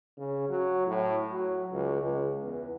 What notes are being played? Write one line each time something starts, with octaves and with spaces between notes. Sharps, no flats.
C#3
F#3
A2
F#3
C#2
C#2
E2